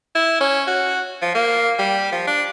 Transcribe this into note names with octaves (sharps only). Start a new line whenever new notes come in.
E4
C#4
F#4
F3
A#3
G3
F3
D4